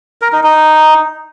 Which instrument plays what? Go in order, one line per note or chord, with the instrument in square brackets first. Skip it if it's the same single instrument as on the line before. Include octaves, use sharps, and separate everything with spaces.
[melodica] A#4
D#4
D#4